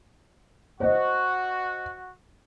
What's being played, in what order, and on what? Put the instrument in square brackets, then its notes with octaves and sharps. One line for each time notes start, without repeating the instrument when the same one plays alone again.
[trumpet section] F#4 [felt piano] C5 D#5